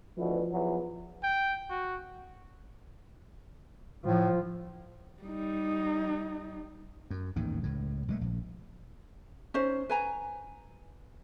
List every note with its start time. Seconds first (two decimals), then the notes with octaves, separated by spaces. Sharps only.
0.18 D2 B2 E3 F3
0.52 E2 E3 F#3
1.23 G5
1.70 F#4
4.05 A2 F3
5.23 G3 D#4
7.10 F#2
7.36 A1 D#2 G#2 D#3
7.63 C#2 A2
8.08 B1 G#3 A3
8.21 A#1
9.54 C#4 D#4 C5
9.89 B4 G#5 A#5